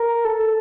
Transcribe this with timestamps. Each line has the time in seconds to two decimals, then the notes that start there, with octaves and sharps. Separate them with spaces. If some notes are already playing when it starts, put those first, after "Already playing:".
Already playing: A#4
0.25 A4